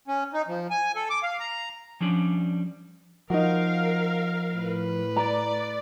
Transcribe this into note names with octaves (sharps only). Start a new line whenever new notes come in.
C#4
D#4
F3
G#5
A4
D6
F5
A#5
F3 G3 C#4 D4
F3 D#4 F#4 A#4 F5
A2 B4
D5 A#5